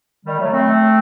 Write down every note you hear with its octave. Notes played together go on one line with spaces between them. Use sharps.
D#3 G3
F#3 A3
A3 C4